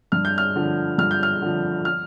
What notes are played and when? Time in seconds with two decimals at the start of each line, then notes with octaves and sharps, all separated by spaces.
0.12 G2 F6
0.25 G6
0.38 F6
0.56 D3 F3
0.98 G2 F6
1.11 G6
1.23 F6
1.42 D3 F3
1.85 F6